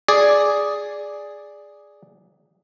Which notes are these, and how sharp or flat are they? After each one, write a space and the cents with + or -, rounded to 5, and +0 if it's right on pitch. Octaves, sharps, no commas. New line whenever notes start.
G#4 +0 D5 +0